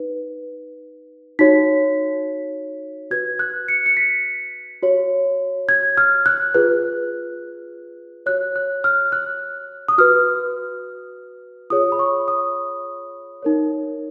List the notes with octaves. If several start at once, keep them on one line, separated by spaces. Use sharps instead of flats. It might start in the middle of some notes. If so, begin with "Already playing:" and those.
Already playing: D#4 B4
D#4 F#4 C#5 B6
F#4 B4 G#6
F#6
C#7
C#7
B6
F#4 C#5
G#6
F6
F#6
F4 G#4 B4 F#6
F#4 C#5 F#6
F#6
F6
F#6
D#6
F#4 B4 F6
F4 G#4 C#5 D#6
B5
C#6
D#6
D#4 A#4 C#5